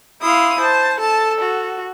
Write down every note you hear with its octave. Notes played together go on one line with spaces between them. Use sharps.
E4 F5 C6 D#6
C5 A5
A4 A5
F#4